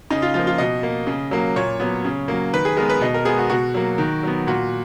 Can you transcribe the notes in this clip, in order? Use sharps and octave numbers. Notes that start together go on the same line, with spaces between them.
C#3 D#4
F4
F3 A#3 F4
F4
B2 D#5
A#3
C#3
F#3 A#3
A#2 C#5
F#3 B3
C#3
F#3 A#3
D#3 B4
G#4
G#3 B3 A#4
B4
B2 D#5
A#4
G#3 B3 G#4
F#4
B2 F#4
F#3 A#3
D#3
F#3 B3
A#2 F#4